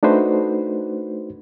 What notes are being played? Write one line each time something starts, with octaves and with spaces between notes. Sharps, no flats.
A3 D4 D#4 F#4 B4 C5